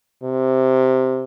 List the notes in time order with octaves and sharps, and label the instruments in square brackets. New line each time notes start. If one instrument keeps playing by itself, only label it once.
[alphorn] C3